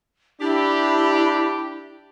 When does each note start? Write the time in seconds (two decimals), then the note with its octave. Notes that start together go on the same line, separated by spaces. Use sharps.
0.41 D4 E4 G4